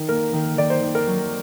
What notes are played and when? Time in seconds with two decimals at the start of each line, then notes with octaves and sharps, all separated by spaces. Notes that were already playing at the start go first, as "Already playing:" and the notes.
Already playing: D#3
0.09 A#3 A#4
0.33 D#3
0.58 D#3 D5
0.70 C5
0.83 D#3
0.95 A#4
1.07 F#3